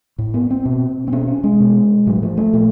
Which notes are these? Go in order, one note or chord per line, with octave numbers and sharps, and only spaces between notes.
A2
B3
C4
B2
C4
B2 C#4
C#4
G#3
B2
A2 F#3
F3
A3
A#2